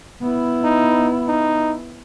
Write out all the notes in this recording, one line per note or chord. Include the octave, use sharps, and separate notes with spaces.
B3 E4
D#4
D#4